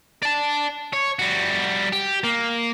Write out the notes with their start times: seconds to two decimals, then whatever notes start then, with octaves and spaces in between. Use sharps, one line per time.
0.23 D5 A5
0.93 C#5
1.19 G3 F#4
1.92 G4
2.24 A#3